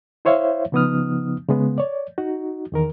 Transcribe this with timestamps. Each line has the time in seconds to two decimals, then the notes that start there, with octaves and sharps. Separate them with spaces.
0.25 E4 C5 C#5 E5 F5
0.72 C#3 F3 B3 D#4 D#6 F6
1.49 C#3 G#3 B3
1.78 C#5 D5
2.18 D#4 F#4
2.72 E2 D#3 A#4